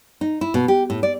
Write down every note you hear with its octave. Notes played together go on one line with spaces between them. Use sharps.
D#4
E4
B2
G4
A2
D5